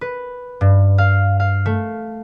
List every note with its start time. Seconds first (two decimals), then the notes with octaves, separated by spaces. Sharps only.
0.01 B4
0.61 G2
0.98 F5
1.40 F5
1.66 A3